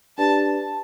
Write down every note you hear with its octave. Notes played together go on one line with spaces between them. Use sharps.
D4 G4 B4 D5 A5